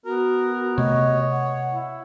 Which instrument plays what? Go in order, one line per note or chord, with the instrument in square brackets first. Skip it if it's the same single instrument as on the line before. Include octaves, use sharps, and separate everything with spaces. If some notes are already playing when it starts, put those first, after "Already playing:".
[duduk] B3 [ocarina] F#4 [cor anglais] A#4
[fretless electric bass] C3 A3 [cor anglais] C#5 [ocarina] D#5
[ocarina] F#5
[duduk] E4